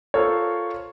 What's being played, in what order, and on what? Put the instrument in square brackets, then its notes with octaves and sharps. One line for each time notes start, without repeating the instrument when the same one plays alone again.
[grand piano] F4 A4 A#4 C5 C#5